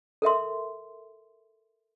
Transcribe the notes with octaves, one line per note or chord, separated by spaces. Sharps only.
A4 A#4 E5 C6